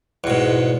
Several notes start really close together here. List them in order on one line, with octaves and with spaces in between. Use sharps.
E2 B2 G#2